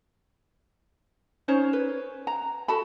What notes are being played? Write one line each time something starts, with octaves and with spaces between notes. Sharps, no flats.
C#4 D#4 C5 C#5
B4
A#5
F#4 A4 A5 B5